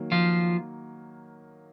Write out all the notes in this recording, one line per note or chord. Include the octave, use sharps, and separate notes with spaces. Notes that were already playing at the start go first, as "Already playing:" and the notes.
Already playing: D#3 F#3 A#3
F3 F4